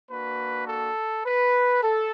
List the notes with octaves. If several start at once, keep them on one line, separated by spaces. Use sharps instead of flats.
A#3 D4 F#4 B4
A4
B4
A4